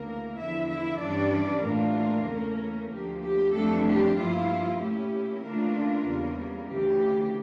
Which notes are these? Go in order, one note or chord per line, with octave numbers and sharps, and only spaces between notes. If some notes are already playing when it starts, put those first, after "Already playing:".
Already playing: D2 C#3 E3 A#3 A#4
E2 D3 F3 E4 E5
E4 E5
G2 E3 G3 C#4 D4 D5
A2 E3 G3 A#3 D4 F4 A#4
E2 C#3 E3 A3 C#4
D2 D3 F3 A#3 G4
G4
F2 E3 G3 A3 D4 A4
G4
G2 F3 A#3 E4 F4
A#2 A3 C#4 E4 G4
C#3 E3 A3 A#3 D4 F4 A#4
E2 C#3 G3
D2 C#3 E3 G4